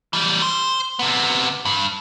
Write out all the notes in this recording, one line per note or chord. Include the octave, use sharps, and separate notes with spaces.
E3 G3
C5
C3 B3
G2